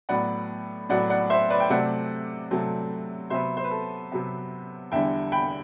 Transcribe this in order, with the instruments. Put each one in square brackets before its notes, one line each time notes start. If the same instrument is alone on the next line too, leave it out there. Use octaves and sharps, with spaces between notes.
[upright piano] A2 F#3 B3 D5 F#5
A2 F#3 B3 D5 F#5
D5 F#5
C5 E5
B4 D5
G5
C3 F#3 A3 C4 D5 F#5
C3 F#3 A3 C4
C3 F#3 B3 C5 E5
C5
B4
A4
C3 F#3 B3
E2 D3 G3 E5 G5
G5 B5